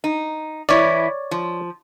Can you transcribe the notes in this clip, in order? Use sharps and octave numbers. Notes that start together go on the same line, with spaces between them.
D#4
E3 E4 C#5 D5
F3